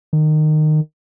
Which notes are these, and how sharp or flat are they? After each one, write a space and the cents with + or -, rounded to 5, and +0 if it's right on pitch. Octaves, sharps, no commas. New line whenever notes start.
D#3 -20